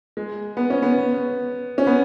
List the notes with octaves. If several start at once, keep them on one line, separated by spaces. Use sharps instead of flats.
G#3
B3
C#4
B3
C#4
B3